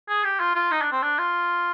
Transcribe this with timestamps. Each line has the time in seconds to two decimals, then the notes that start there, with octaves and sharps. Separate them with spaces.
0.09 G#4
0.24 G4
0.40 F4
0.55 F4
0.71 D#4
0.82 D4
0.92 C4
1.02 D4
1.19 F4